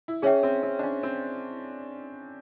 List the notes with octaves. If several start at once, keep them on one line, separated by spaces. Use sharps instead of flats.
E4
C#4 G#4 C#5 E5 G5
C4
C4
D4
C#4
C4